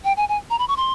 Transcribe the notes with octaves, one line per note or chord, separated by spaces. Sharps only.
G5
G#5
G#5
A#5
B5
C#6
C6